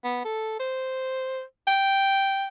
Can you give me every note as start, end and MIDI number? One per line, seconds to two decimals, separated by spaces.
0.04 0.21 59
0.25 0.57 69
0.59 1.42 72
1.67 2.47 79